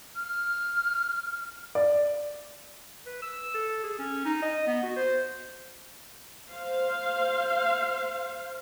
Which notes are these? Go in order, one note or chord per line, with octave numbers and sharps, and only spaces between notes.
F6
D5
B4
E6
A4
G#4
C#4
D#4
D#5
B3
F#4
C5
C5 F5